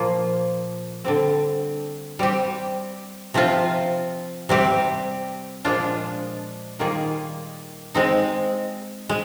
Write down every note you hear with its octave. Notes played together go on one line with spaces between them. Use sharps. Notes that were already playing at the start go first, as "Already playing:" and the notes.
Already playing: A#2 F3 A#3 F4
D3 G3 C4
G3 C4 G4
C3 F3 C4 F4
C3 G3 C4 G4
A#2 F3 G#3 D4 F4
D#3 G3 A#3 F4 G#4
G#3 C4 D#4
G#3